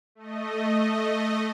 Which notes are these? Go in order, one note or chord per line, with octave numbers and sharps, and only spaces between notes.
A3 D#5